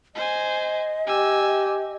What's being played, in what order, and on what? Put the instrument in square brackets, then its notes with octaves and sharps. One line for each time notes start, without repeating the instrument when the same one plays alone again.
[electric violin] C5 G#5 [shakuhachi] D#5
[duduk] G4 [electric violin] G#5 E6